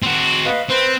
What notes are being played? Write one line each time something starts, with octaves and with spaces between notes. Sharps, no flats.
C4 F#4
B4 D#5 F5
C4 B4 C5